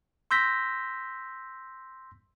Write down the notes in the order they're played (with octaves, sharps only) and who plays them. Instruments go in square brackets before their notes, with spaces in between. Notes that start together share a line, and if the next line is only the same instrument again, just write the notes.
[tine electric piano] C6 E6 G6 A#6 B6